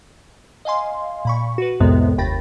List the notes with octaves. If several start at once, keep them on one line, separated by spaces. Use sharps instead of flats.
D#5 F5 G#5 C6
A#2 B5 C#6
F#4 B4
C2 F2 A2 C3 G#3 B3
G1 D#2 G5 B5 A6 A#6